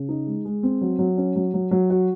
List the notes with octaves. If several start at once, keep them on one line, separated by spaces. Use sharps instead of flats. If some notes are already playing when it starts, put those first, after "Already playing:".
Already playing: C#3
D#4
G#3
G#3
C4
F#3
F#3
C#4
F#3
F#3
F#3
F#4